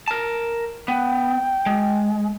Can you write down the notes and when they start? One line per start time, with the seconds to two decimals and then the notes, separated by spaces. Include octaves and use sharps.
0.08 A#4 A5
0.88 B3 G5
1.66 G#3